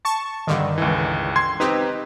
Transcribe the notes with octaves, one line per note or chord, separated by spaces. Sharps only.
A5 C#6
G2 D3 D#3
C#2 E3
C6 G#6
C4 D#4 G4 B4